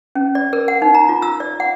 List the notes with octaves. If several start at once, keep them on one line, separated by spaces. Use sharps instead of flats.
C#4
D5
A#4
F#5
D#4
A#5
F4
E6
D5
F#5